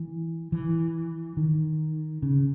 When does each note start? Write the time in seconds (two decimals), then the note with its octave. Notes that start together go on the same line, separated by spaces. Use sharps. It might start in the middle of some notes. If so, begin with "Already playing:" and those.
Already playing: E3
0.52 E3
1.37 D#3
2.22 C#3